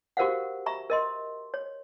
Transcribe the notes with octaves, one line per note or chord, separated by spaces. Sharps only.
F#4 G4 A#4 C5 F5 F#5
E5 A#5 C#6
A#4 D#5 C6
C#5